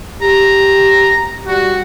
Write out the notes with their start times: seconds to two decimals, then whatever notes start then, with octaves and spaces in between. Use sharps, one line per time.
0.22 G4 A#5
1.47 G3 F#4